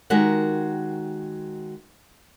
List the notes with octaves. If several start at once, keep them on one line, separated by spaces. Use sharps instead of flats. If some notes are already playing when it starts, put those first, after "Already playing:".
D#3 G#3 F#4 G4 A#4 F#5